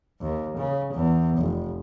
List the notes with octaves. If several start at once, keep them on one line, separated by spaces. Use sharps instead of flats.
D#2
C#3
E2
F1